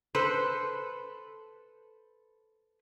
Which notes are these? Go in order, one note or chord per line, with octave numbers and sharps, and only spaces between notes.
A4 B4 C5